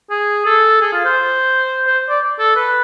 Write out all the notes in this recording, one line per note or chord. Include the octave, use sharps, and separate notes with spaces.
G#4
A4
G#4
F4
C5
C5
D5
A4
B4